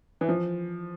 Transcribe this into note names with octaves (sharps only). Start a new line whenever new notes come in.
E3
F3